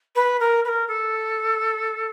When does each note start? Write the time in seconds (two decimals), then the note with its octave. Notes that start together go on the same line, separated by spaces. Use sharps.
0.15 B4
0.40 A#4
0.64 B4
0.68 A#4
0.88 A4